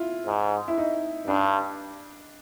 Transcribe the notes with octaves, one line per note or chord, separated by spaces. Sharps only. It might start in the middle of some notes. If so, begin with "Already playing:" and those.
Already playing: E4 F4
G#2
E4
D#4
G2 D4